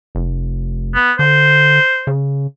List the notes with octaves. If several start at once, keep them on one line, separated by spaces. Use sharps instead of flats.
F1
B3
D3 C5
C#3